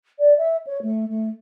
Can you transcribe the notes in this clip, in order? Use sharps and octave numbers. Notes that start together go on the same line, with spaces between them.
D5
E5
C#5
A3
A3